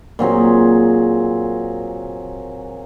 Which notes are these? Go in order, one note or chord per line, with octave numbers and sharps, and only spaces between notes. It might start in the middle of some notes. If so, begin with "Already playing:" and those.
A#2 F#3 C4 G#4